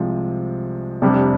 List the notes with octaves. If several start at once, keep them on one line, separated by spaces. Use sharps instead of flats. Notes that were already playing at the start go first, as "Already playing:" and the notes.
Already playing: C2 C3 F3 G#3
F1 F2 C3 G3 D4